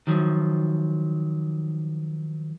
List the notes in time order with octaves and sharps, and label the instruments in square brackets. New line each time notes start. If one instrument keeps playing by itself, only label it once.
[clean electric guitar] D#3 F3 F#3